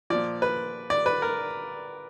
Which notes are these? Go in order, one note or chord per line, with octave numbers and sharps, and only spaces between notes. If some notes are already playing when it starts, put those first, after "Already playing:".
A#2 F3 D5
B4
D5
B4
A#4